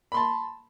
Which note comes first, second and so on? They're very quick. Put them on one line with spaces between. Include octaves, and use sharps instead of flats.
B5 C6 A5